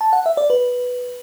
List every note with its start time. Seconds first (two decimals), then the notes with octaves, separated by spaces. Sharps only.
0.01 A5
0.13 F#5
0.26 E5
0.37 D5
0.50 B4